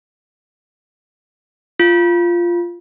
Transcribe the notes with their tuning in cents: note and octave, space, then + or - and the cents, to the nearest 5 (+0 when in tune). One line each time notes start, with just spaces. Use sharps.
F4 -10